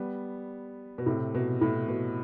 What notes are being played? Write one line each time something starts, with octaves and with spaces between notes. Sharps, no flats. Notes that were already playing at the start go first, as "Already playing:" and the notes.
Already playing: G3 B3
B2
A2 C3
B2
A2
B2